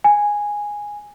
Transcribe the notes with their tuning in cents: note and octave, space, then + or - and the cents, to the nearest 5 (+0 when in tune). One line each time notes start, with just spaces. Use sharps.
G#5 -5